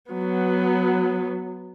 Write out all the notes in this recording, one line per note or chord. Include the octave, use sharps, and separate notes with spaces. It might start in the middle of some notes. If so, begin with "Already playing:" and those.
F#3 B3